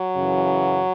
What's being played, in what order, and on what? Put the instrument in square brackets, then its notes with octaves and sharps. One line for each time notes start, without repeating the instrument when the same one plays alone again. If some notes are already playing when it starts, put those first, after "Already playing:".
Already playing: [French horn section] F#3
F#2 C#3 E3